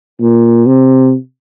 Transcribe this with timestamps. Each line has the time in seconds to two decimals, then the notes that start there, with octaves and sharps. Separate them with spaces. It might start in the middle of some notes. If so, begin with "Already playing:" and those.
0.21 A#2
0.66 C3